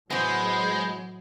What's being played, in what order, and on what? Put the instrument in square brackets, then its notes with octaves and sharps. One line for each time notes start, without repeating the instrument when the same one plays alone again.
[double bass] A2 F#3 [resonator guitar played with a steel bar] E3 B3 [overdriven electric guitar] G#3 [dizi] C5